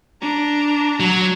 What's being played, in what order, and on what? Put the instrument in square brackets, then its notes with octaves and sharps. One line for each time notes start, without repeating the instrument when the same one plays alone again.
[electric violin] D4 A#5
[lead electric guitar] F#3